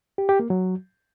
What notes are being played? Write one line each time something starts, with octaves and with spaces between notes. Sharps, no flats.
G4
G4
A#3
F#3